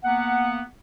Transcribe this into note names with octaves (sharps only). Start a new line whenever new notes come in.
A#3 B3 F#5